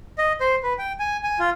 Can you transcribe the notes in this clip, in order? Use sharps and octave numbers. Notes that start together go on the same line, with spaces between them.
D#5
C5
B4
G5
G#5
G#5
F4